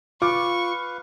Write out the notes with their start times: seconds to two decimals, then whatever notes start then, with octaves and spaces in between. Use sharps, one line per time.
0.22 F4 B4 F5 C#6 D6